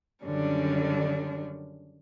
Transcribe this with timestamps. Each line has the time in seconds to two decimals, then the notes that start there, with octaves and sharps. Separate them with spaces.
0.24 F#2 D3 D#3 G3 C#4 D4